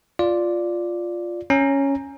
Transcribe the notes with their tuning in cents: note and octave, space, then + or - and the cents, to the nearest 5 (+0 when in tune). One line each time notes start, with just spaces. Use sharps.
F4 +0 D5 +0
C#4 +0 A#5 +0